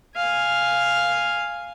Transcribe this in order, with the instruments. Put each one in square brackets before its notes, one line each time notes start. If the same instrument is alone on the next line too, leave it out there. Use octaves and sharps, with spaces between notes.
[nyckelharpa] F5 G#5